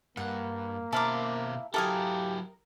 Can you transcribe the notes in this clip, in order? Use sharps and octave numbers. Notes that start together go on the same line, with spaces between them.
G2 A#3 F#5
B2 E4 C5 F5 A5 A#5 D6
F#3 E4 G4 A4 A#4 F5 G#5 D#6